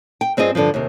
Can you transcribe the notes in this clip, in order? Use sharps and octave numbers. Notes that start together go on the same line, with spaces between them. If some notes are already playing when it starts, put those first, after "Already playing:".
G5
G2 C4 F4 G#4 D#5
G2 D3 E3 F3
D#2 C3